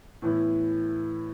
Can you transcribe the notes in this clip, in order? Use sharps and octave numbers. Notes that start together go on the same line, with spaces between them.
A2 E3 B3 E4